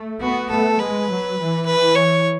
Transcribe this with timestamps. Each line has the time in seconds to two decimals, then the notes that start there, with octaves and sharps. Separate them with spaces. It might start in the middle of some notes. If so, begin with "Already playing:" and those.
Already playing: A3
0.21 B3 F#4
0.50 A3 A4
0.79 G#3 B4
1.08 F#3
1.37 E3
1.66 B4
1.95 C#5